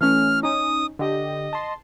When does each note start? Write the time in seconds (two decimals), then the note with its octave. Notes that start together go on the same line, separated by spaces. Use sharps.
0.01 E3 A3 C#4 F6
0.43 C#4 D#4 D#6
0.99 D3 G4 D#5
1.53 A5 C6